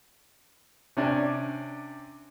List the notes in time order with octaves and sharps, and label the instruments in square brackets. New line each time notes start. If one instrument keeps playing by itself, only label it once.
[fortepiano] C3 C#4 D4